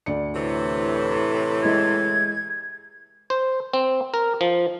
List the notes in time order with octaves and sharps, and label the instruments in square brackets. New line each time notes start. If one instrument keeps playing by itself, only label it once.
[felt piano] D2 D5 C#7
[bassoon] A2 [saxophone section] C3 E3
[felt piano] G#3 E4 D#5 [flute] G#6
[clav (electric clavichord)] C5
C4
A#4
F3